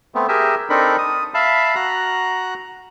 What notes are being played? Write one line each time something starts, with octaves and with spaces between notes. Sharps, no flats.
A3 B3 C4
G4 G#4 A#4 E5
C4 D4 D#4 A4 A#4 B5
D#6
E5 F5 A5 B5
F#4 A#5 F#6